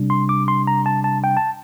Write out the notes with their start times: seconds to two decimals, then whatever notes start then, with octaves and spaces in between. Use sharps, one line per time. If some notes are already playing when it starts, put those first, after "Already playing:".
Already playing: C3 G3 D4
0.10 C6
0.29 D6
0.48 C6
0.67 A#5
0.86 A5
1.04 A5
1.24 G5
1.37 A5